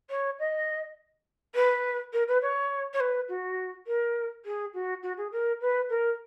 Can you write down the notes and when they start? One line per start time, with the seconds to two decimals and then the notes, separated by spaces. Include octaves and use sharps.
0.10 C#5
0.39 D#5
1.55 B4
2.13 A#4
2.27 B4
2.42 C#5
2.93 C#5
3.00 B4
3.28 F#4
3.87 A#4
4.45 G#4
4.73 F#4
5.02 F#4
5.17 G#4
5.32 A#4
5.61 B4
5.89 A#4